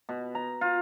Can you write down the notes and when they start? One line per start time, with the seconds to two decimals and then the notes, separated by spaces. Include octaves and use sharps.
0.09 B2
0.35 A#5
0.61 F4